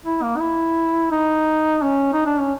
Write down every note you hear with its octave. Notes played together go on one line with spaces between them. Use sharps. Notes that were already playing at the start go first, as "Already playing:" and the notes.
E4
A#3
D#4
E4
D#4
C#4
D#4
D4
C#4